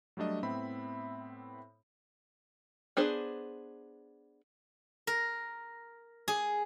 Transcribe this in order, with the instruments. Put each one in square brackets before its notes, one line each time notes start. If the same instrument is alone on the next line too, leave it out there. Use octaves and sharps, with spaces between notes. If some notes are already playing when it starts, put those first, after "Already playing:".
[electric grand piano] F#3 G3 A3 D4 D#5
A2 B3 C4 E5 B5
[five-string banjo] B3 D4 G#4 C5
[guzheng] A#4
G#4